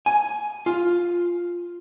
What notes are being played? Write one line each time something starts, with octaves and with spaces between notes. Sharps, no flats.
G#5
F4